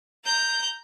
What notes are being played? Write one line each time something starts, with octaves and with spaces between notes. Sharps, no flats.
A#5 G6